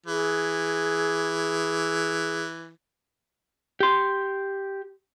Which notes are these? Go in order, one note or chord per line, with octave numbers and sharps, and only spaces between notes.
E3 G#4
G4 C6